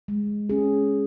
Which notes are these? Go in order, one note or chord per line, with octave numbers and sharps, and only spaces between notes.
G#3
C#4 G#4